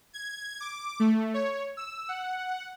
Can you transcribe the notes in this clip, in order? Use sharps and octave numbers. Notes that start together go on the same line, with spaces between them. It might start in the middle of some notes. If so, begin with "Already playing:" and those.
G#6
D6
A3
C#5
E6
F#5